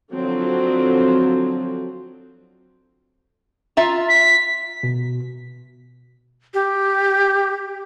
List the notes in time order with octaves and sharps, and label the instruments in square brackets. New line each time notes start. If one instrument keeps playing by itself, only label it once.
[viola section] D3 F3 F#3 C4
[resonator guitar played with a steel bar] F4 E5 A#5
[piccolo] B6
[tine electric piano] B2
[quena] G4